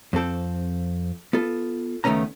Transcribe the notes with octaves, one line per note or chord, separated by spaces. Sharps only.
F2 C4 A4 G5
B3 F4 A4
C#2 D#3 A3 B3 C#4 A#5